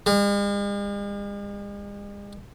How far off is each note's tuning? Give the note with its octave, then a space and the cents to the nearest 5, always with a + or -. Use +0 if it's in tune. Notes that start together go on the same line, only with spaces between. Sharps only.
G#3 -45